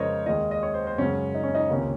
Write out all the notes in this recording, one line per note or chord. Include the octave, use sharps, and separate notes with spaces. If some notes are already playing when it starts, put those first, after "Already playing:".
Already playing: F2 C#3 G#3 A#4 C5 C#5 D#5
D#2 D#3 G#3 D#5
D#5
C#5
C5
C5
F#2 C#3 G#3 C#4
D#4
C#4
D#4
C#2 C3 D#3 A#3 C#4